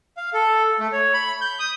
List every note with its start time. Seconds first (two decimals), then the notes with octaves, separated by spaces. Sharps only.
0.17 F5
0.34 A4
0.80 A3
0.92 C#5
1.14 B5
1.41 G6
1.59 D#6